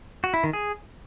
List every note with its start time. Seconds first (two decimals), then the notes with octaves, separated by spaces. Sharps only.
0.24 F#4
0.34 E4
0.44 D#3
0.53 G#4